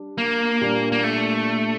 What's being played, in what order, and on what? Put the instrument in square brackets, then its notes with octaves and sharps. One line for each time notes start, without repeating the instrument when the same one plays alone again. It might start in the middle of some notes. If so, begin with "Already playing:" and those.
Already playing: [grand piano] G3 D4
[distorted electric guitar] A#3
[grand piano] A#2 G3 D4
[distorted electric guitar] A#3
A3